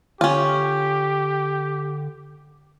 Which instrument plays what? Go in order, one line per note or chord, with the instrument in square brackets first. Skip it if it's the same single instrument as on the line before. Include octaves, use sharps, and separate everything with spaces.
[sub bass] D3 [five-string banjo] C#4 F4 [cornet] G4